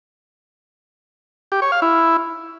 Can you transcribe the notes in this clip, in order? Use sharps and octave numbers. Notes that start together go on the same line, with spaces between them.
G4
C#5
F5
E4